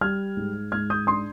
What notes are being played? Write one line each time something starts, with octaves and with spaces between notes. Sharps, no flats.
G3 F6 G#6
G#2
G#2 F6 G#6
D#6 G6
D4 C6 D#6